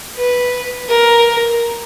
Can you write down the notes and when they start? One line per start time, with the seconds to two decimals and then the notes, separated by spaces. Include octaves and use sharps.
0.17 B4
0.89 A#4